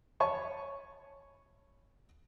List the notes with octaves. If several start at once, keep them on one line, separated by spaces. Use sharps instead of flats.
C#5 G#5 A5 B5 C#6